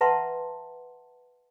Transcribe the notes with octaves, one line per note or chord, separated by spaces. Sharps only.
B4 E5 F#5 A5 A#5 C6